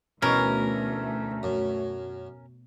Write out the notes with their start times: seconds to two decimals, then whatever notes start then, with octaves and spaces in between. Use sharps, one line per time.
0.22 D2 B2 E3 A3 C#4 A#4
1.43 F#2